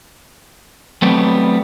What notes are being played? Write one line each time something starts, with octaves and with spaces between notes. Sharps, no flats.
F#3 G3 A3 B3 C4